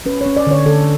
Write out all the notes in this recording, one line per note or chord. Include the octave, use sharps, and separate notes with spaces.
C#4 B4
C#4 C#5
D5
D3 C#5
D3 A4